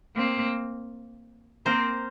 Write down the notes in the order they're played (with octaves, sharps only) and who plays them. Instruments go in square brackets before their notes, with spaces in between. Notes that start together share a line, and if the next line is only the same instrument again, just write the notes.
[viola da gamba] A#3 C4
[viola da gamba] A#3 C4 [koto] A#4 C5